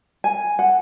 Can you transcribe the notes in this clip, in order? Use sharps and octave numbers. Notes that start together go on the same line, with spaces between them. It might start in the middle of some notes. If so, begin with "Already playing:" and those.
G#5
F#5